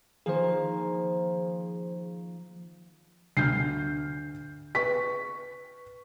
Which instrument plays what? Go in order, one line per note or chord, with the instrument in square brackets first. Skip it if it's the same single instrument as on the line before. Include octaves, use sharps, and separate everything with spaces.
[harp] D#3 F3 A#3 [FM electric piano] G#4 C5
[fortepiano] D2 [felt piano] F6 G6 C7
[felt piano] B4 C#6 B6